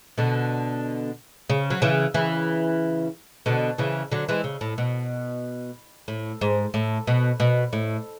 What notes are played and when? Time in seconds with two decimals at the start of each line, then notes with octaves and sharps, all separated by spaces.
0.18 B2 D3
1.50 C#3
1.70 F#3
1.82 C#3 E3
2.14 C#3 E3
3.46 B2 D3
3.78 C#3 E3
4.12 D3 F#3
4.29 E3 G#3
4.44 C#3
4.61 A2
4.78 B2
6.08 A2
6.41 G#2
6.74 A2
7.07 B2
7.40 B2
7.73 A2